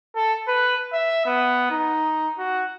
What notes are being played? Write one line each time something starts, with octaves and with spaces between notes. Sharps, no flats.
A4
B4
E5
B3
D#4
F#4